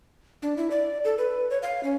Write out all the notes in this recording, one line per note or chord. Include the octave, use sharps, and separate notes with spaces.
D4
E4
D5
A4
B4
C#5
F5
C#4